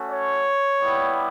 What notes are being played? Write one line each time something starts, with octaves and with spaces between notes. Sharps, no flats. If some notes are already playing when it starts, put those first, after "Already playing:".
Already playing: A3 C#4 F#4
C#5
G3 B3 E4 G4